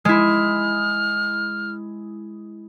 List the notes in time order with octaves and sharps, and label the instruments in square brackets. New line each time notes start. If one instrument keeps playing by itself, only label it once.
[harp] G#3 E4 [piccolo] F6